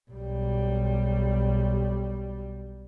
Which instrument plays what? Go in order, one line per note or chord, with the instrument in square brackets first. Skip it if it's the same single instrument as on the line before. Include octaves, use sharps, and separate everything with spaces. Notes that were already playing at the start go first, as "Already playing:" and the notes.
[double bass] B1 G3